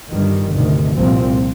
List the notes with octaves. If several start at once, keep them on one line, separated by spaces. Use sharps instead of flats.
G1 G2 D#3 G3
D2 C3 D#3
C2 A#2 F3 C4